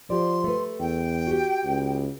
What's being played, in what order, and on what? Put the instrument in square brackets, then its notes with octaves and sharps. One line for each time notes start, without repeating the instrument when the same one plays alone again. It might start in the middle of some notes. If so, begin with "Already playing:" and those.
[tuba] F3 [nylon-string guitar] G4 D5 [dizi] C6
[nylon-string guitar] A3 B4
[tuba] E2 [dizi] G5
[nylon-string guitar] F#4 G4
[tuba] C#2